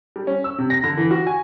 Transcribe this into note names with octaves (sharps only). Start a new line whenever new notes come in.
G3
C#4
E6
C3
A#6
D3
E3
F#4
G#5